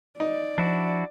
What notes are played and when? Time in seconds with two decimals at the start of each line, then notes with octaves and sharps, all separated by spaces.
0.20 D#4 D5
0.58 F3 D4 E4 F#4